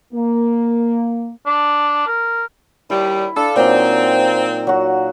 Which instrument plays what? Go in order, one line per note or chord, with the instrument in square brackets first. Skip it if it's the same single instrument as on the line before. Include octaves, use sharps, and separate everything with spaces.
[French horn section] A#3
[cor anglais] D4
A#4
[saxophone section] D#2 G3 [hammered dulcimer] E4
[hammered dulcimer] D4 F5 [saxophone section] A4
[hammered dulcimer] A#2 F#3 D#4 [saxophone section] C4
[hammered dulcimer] F#3 F#4